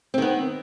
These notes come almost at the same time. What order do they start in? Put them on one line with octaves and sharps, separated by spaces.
C4 D#3 B3